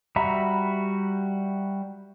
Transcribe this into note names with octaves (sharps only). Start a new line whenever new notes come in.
G3 F#4 E5 A#5 B5